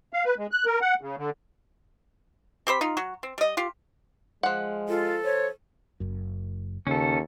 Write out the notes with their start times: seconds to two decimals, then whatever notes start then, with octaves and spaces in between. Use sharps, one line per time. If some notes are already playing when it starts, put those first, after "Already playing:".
0.13 F5
0.25 B4
0.38 G#3
0.51 F#6
0.66 A#4
0.82 F#5
1.01 C#3
1.17 D3
2.67 C4 G4 C5 B5
2.81 D#4 F4
2.97 F#3 F#4
3.23 C4
3.38 G3 D#5
3.57 F4 G4
4.43 F3 G#3 F#5
4.88 F4 A4
5.25 C5 C#5
6.00 F#1 F#2
6.87 D#2 C#3 C#4 A4